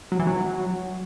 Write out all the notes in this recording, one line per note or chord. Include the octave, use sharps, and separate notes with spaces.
F#3
E3
F#3